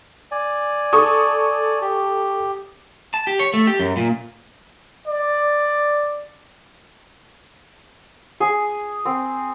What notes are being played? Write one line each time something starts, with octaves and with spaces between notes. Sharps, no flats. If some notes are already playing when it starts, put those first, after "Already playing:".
D5 G#5
A4 C#6 D#6
G4
A5
G4
C#5
A3
G4
F#2
A#2
D5
G#4
C4